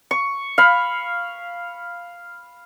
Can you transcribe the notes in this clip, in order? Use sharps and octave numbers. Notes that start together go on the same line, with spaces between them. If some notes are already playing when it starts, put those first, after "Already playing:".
C#6
F5 B5